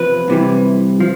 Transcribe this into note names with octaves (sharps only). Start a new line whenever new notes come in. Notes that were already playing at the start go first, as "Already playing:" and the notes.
Already playing: E2 C3 F3 B4
C2 C3 E3
F3